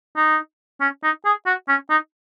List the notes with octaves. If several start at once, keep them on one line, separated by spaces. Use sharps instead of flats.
D#4
C#4
D#4
G#4
F#4
C#4
D#4